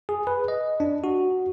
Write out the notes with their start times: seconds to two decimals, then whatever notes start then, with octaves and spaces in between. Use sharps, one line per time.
0.09 G#4
0.27 B4
0.48 D#5
0.80 D4
1.04 F#4